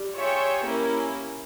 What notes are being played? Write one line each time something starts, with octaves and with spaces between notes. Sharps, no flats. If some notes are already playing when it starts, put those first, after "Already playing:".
Already playing: G3
F4 G#4 C#5 E5 G5
A#3 C#4 E4